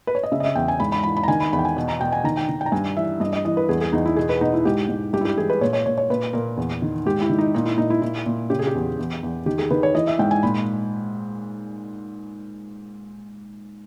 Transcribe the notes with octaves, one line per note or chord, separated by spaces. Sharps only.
B4
C#5
D#5
C#3 E5
D#5
E5
E2 G5
G#5
G#2 B5
B5
E3 B5
B5
A#5
D#3 G#5
B5
E2 B5
G5
G#5
B2
A#5
B2 G5
G#5
D#3 A#5
G5
D#3
G5
A#5
G2 G#5
E3 E5
G2 D#5
D#5
E3 D#5
B4
E2 G#4
G#4
E2 D#4
E4
B2 G#4
B4
B2 D#4
E4
G#2 G4
G#2
G2 G4
E4
G4
E3 G#4
B4
A#2 C#5
C#5
A#2 C#5
C#5
A#2 B4
A#2 A#4
E2
D#3
G#2 G4
E4
D#3
D#4
A#2 D#4
E4
A#2 D#4
E4
A#2 E4
A#2
C#3 G4
G#4
G4
E2
E2
E2
D#3 G4
G#4
D#3 B4
C#5
E3 D#5
E5
G#2 G5
G#5
A#2 B5